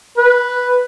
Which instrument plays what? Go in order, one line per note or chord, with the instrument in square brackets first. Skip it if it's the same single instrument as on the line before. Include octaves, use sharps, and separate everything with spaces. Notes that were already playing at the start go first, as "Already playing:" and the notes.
[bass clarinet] B4